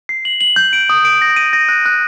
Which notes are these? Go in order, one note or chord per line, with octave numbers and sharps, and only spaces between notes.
C7
F#7
F#7
G6
D7
D#6
D7
A#6
D#7
A#6
F#6
F#6